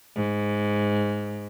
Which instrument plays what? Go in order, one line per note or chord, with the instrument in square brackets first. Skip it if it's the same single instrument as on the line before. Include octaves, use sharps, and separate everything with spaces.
[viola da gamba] G#2